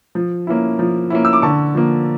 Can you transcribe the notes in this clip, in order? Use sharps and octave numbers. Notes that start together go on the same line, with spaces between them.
F3
A#3 C#4 E4
F3
A#3 C#4 E4
E6
D6
D3 A5 C#6
F3 A#3